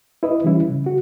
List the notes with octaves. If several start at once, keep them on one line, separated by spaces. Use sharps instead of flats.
E4 B4 D#5
E3 G3 C#4 E4
C#3
F#4